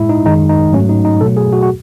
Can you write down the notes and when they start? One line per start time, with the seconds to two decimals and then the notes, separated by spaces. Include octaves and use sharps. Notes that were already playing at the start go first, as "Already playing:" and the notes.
Already playing: A2 G#3 E4
0.09 D#4
0.25 F#2 D#3 G#3 D#4
0.49 D#4
0.73 G#2 F#3 A3 C#4
0.89 D#4
1.05 D#4
1.21 B2 F#3 A3 A4
1.37 G#4
1.53 F#4
1.63 F#4